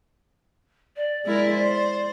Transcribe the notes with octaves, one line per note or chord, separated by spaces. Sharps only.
D5
G#3 E4 A#4
C5